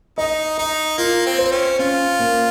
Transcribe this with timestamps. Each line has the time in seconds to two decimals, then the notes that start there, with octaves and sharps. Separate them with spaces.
0.18 D#4 D#5
0.58 D#4 D#5
0.98 A#3 F4
1.26 C4
1.38 C5
1.45 C4
1.52 C#4
1.79 C#4 F4
2.19 A#3